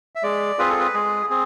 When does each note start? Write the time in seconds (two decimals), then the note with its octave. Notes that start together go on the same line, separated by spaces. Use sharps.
0.15 E5
0.23 G#3 D5
0.58 C4 F4 G#4 B4
0.69 A4
0.80 B4
0.94 G#3 G#4
1.30 C4 G#4